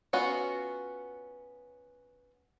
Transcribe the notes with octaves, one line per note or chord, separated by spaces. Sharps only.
B3 C#4 F4 F#4